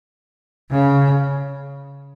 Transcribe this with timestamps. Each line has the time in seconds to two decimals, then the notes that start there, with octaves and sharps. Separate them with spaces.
0.71 C#3